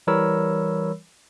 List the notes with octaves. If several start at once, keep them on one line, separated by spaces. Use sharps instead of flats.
E3 G3 A#4 C#5 B5 E6